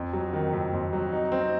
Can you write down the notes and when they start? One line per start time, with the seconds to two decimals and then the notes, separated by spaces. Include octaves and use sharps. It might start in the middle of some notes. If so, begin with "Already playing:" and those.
Already playing: F2
0.13 F#3
0.33 D#3
0.53 F2
0.73 F2
0.93 F#3
1.12 D#4
1.32 C4